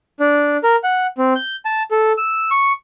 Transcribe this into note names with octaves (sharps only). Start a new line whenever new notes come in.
D4
A#4
F#5
C4
G6
A5
A4
E6
C#6